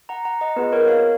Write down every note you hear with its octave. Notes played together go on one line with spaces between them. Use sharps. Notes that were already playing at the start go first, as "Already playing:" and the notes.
F#5 A#5
F#5 A#5
D#5 F#5
B3 F4 G#4 B4 D#5
A#4 C#5
C#5 F5